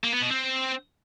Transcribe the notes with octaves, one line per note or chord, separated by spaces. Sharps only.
A#3
B3
B2
C4